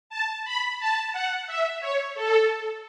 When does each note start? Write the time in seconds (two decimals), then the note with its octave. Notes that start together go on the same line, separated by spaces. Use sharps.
0.10 A5
0.45 B5
0.79 A5
1.13 F#5
1.47 E5
1.80 C#5
2.15 A4